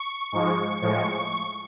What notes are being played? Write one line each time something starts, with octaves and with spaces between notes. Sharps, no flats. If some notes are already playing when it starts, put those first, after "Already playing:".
Already playing: C#6
G#2 F3 G#3
A2 F3 G#3